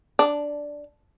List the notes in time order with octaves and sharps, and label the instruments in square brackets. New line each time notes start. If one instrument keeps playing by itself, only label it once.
[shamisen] D4